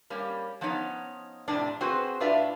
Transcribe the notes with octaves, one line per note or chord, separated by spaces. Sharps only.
G3 A#3 C#4
F3 B3 C#4 D#4 C#5
F2 A2 C3 D4
C4 F#4 G#4 B4 C5
A2 D4 F4 B4 D5 E5